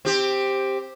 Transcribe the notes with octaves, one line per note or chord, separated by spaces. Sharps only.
C4 G4